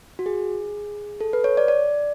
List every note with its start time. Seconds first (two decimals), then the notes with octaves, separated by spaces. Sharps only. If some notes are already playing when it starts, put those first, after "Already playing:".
0.19 F#4
0.26 G#4
1.21 A4
1.33 B4
1.44 C#5
1.57 D5
1.68 D5